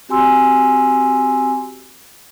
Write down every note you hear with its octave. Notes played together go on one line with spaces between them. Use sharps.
C4 F#4 G4 G#5 C6 E6